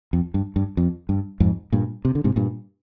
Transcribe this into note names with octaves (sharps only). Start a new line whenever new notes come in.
F2
G2
G2
F2
G2
F2 G#2
G2 A#2
C3
D3
G#2 C3
G2 A#2